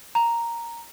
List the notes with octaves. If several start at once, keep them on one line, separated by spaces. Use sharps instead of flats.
A#5